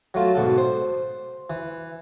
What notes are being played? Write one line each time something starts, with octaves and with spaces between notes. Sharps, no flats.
F#3 A3 F4
G#2 B2 A4
C5
E3